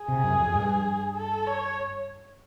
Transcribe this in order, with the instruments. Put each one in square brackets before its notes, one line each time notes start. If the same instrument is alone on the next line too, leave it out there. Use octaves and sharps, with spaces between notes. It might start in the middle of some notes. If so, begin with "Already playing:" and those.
Already playing: [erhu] G#4
[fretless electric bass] C3
F#2
F2
G2
[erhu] A4
C#5